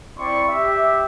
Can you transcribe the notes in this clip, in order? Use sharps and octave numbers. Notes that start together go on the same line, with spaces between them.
C4 E4 D5 C6 C#6
G4 E5